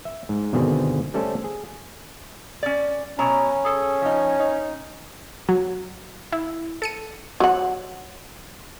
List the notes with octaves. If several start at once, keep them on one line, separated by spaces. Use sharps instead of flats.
E5
G#2
G1 B2 D3 D#3 C4 G#4
G3 A3 C#4 A4 C5
G#4
C#4 D5
B2 F#3 C#4 A#5
G#4 A4
F3 D#4
D#4
F#3
E4
A4 C#7 D#7
F#3 F#5